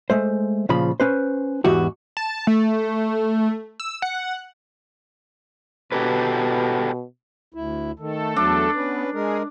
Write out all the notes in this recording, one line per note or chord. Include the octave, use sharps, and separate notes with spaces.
G#3 A3 C5
A#2 C#3 F3 B5
C#4 B4 C5
E2 G#2 E3 F#4 G4
A5
A3
E6
F#5
B2 G4 A4 B4
D2 E4
D#3 A3 A4
E2 F#3 D4
B3 C#4 B4
G#3 G#4 A#4